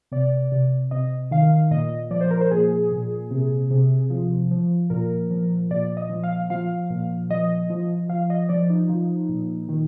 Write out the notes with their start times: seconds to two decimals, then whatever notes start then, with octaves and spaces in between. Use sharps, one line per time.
0.12 C3 D5
0.52 C3
0.91 C3 D#5
1.31 D#3 F5
1.71 A#2 D#5
2.11 F3 D5
2.21 C5
2.31 A#4
2.41 C5
2.51 A#2 G#4
2.92 A#2
3.31 C3
3.71 C3
4.10 F3
4.51 F3
4.90 A#2 A#4
5.31 F3
5.71 A#2 D5
5.97 D#5
6.10 F3
6.23 F5
6.50 F3 F5
6.90 A#2
7.30 F3 D#5
7.70 F3
8.09 F3 F5
8.30 D#5
8.49 F3 D5
8.70 D#4
8.89 F3
9.29 A#2
9.69 D#3